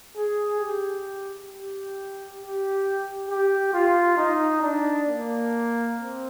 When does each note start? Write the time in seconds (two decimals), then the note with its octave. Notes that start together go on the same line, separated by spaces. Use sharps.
0.16 G#4
0.60 G4
1.50 G4
2.39 G4
3.28 G4
3.73 F4
4.18 D#4
4.62 D4
5.08 A#3
5.97 C4